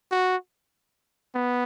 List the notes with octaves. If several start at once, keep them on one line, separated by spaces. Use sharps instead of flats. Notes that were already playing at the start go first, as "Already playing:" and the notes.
F#4
B3